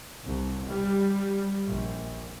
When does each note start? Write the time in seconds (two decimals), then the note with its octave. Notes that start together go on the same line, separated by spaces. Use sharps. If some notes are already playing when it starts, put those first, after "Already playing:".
0.24 C2
0.69 G3
1.67 A#1